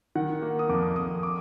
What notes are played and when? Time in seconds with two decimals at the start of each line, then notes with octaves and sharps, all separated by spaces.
0.15 D#3 F#5
0.42 A#3
0.59 D#6
0.69 F2 D6
0.96 F2 D#6
1.23 D6